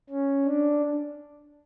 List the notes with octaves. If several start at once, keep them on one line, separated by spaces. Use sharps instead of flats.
C#4
D4